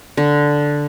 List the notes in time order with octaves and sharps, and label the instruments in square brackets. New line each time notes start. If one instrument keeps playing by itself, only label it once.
[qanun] D3